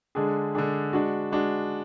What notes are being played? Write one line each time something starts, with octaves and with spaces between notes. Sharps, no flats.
D3 G#3 D4 G#4
D3 G#3 D4 G#4
G#3 D4 F#4
G#3 D4 F#4